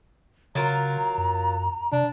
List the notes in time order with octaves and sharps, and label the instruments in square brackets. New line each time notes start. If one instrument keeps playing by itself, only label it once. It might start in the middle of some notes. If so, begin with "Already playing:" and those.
[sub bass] C#3 [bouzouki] F#3 F4 A#4 [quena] A#5
[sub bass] F#2
[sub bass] C3 [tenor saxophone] D4